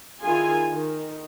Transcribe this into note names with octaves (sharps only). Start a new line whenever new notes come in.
D#3 E4 F4 G#4 G#5
D#3